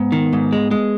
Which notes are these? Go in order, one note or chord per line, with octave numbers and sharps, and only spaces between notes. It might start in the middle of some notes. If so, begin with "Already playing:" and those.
Already playing: G#2 B3
D#3
G#2
G#3
G#3